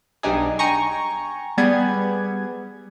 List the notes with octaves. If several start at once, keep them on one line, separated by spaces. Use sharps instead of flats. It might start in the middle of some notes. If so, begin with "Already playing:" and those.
B1 G3 D4 D#4 G#4
G5 G#5 A#5 C#6
G3 B3 G#4 G#6